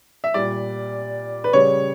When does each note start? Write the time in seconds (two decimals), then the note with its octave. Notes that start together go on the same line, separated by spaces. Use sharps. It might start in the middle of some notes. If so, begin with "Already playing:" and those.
0.24 E5
0.34 A#2 G3 D5
1.44 B4
1.53 C#3 G3 C#5